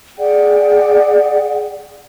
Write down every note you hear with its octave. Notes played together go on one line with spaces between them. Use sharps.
G#4 D5 F#5 G5